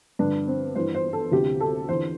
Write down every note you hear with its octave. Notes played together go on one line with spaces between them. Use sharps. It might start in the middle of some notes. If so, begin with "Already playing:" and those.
G2 D3 D4
C4
G2 E3 C5
C5
A4
D2 C3 E3 G4
A4
E2 D3 C5